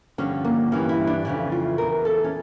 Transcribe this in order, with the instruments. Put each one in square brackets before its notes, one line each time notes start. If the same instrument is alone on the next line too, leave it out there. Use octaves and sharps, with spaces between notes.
[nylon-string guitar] G2 D3 F3 C#4
A#3
G2 E3 C#4
E4
D4
F2 C#3 E3 E4
F4
E2 E3 A#4
A4
C#4